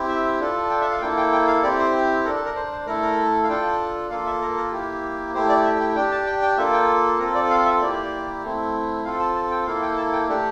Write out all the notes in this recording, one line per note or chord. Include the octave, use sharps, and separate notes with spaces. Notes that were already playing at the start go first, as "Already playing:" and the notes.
Already playing: C4 E4 G4
E5
D4 F4 A4
G5
E5
F5
A#3 E4 A4 G5
G5
G5
F5
C4 E4 G4 D5
C5
A4 A#4
D4
A4
A#4
C5
C5
A3 E4 A4 A#4
A#4
F5
D4 F4 A4 G5
A#3 F4 A4 F5
E5
A#4
A#4
A#3 E4 G4
A3 E4 G4 C5
D5
E5
G5
D4 G4 G5
A5
G5
G5
A#3 F4 A4 E5
G5
C4 F4 A4 A#4
D5
F5
E5
A#3 E4 G4 D5
A3 C4 E4
C4 F4 A4 F5
A5
A5
G5
A#3 E4 A4 F5
G5
A5
G5
A3 D4 G4 A4